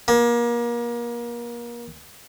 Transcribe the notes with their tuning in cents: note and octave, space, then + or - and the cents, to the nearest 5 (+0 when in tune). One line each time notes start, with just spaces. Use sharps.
A#3 +30